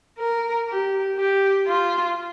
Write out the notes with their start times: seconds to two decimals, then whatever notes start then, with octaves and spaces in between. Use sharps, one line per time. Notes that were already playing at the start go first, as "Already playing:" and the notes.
0.18 A#4
0.68 G4
1.18 G4
1.67 F4